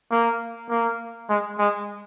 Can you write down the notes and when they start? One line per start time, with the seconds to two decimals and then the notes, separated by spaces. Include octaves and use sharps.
0.11 A#3
0.69 A#3
1.29 G#3
1.59 G#3